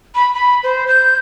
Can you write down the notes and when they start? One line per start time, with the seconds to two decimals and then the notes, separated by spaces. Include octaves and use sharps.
0.15 B5
0.34 B5
0.63 C5
0.88 G6